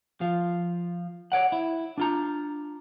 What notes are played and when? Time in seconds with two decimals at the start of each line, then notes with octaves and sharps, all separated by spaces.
0.21 F3 F4
1.32 C#5 D5 F#5
1.52 E4
1.98 D4 F4 A#5